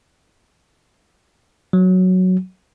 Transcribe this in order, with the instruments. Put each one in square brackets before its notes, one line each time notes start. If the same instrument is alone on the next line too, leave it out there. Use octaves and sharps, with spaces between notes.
[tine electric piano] F#3